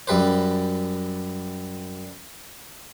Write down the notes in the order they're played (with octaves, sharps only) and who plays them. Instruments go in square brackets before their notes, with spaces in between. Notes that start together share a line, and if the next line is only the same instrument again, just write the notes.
[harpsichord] F#2 G3 B4 C5